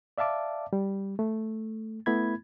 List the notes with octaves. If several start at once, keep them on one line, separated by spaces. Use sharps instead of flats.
D5 E5 F5 A5 D6
G3
A3
A3 B3 E4 B5 G#6